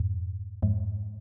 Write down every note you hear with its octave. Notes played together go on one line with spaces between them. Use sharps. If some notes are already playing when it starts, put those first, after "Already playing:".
Already playing: F2 G#2
F2 G#2